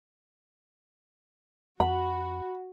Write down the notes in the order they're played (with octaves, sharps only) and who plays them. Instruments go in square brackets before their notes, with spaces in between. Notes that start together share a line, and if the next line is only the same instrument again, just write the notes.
[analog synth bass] F2 [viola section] F#4 [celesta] F#5 [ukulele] B5